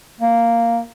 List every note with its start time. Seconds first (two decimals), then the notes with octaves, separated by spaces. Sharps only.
0.21 A#3